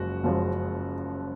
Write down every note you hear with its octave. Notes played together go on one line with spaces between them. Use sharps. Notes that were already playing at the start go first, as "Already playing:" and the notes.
Already playing: F#1 F#2 F3 G#3 F#4
F#1 F#2 F3 G#3